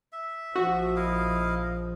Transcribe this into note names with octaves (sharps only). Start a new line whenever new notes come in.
E5
A#1 F3 F#4
E4 D#5 F5